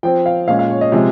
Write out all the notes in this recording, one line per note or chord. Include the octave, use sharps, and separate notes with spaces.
F3 C4 G5
F5
A#2 G#3 C#4 F5
F5
C#5
D#5
C3 F3 G#3